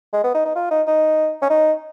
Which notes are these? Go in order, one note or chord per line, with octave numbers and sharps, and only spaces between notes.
G#3
B3
D#4
D#4
F4
D#4
D#4
C#4
D#4